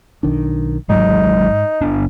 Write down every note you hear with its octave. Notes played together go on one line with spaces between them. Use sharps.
B1 D#3 D4
G#1 G#2 F#3 G#3 D#4
G1 B3 D4